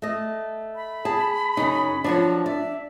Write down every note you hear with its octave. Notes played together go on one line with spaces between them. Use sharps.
A3 D#5
B5
G#4 A5
F#2 C#3 D#4
F3 F#3 D4 C#5
D5 E5